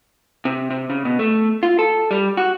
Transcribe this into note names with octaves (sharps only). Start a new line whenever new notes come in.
C3
C3
C#3
B2
A3
F4
A4
G3
F#4